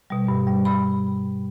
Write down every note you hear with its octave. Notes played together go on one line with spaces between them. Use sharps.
B2 G3
G2
G3
B5